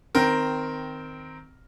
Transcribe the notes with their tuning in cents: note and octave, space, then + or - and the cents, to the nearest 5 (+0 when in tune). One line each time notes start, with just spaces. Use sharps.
D#3 +0 C4 -10 A#4 +0